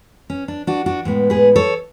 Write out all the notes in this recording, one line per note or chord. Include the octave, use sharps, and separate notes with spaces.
C#4
D4
D4 F#4
D4 F#4
A2 G#3 B3
G#4 B4
A4 C#5